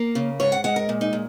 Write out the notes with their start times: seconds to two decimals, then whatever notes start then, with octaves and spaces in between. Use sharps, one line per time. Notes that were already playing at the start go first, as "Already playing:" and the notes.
Already playing: A#3 A#4
0.15 C#3
0.40 G#2 C#5
0.52 F#5
0.64 G#3 F#5
0.76 A#4
0.89 A#2
1.01 D#4
1.13 A#2